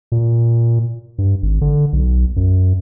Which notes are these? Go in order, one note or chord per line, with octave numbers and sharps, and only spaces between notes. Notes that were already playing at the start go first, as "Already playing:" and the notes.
A#2
G2
G#1
D3
B1
F#2